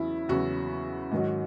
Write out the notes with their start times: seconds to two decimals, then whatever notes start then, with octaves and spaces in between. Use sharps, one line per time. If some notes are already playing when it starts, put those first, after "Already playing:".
Already playing: E2 C#3 F#3 E4
0.29 E2 C#3 F#3 F#4
1.11 G#2 D#3 F#3